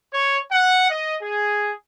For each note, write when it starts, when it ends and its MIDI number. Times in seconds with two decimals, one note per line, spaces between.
0.12 0.38 73
0.51 0.86 78
0.90 1.15 75
1.21 1.72 68